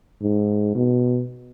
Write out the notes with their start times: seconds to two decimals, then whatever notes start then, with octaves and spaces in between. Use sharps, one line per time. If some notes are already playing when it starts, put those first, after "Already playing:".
0.22 G#2
0.75 B2